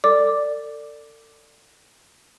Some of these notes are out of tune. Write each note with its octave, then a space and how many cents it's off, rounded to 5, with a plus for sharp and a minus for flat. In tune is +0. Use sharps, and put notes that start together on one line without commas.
A4 +40 D5 +0 D6 +0